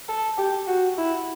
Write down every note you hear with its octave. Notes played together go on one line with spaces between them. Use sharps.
A4
G4
F#4
E4